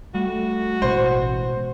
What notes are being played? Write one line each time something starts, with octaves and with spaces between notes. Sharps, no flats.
G3 A3 F#4
A1 B2 G#3 C5